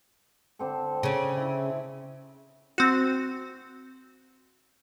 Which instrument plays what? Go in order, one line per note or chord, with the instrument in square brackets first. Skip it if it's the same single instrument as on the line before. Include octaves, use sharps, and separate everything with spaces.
[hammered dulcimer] D3 C4 A4
[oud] C#3 C#4
[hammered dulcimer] E4
[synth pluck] C4 F#4